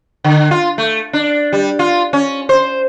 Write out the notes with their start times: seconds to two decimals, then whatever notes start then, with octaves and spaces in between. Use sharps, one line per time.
0.24 D3
0.51 F4
0.78 A3
1.13 D4
1.53 G3
1.79 F4
2.13 C#4
2.49 C5